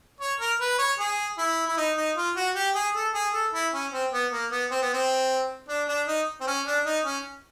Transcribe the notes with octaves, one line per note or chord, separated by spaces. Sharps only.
C#5
A#4
B4
C#5
G#4
E4
E4
D#4
D#4
F4
F#4
G4
G#4
A4
G#4
A4
E4
C#4
C4
B3
A#3
B3
C4
B3
C4
D4
D4
D#4
C4
C#4
D4
D#4
C#4